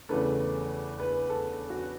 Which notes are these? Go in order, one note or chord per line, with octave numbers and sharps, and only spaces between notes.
E2 C#3 E3 A3 B4
B4
A4
F#4